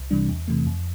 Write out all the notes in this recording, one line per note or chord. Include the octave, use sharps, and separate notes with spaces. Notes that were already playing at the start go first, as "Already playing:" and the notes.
Already playing: C2
C3 E3 G3 D4
E2
C3 E3 A3
F2